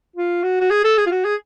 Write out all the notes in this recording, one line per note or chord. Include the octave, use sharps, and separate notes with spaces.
F4
F#4
F#4
G#4
A4
G#4
F4
F#4
G#4